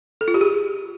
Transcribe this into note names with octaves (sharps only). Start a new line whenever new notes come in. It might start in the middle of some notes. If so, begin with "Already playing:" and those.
A4
F4
G4
G#4